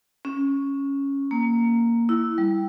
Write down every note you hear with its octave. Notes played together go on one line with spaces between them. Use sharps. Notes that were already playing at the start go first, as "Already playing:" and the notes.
C#4
A#3
E4
G3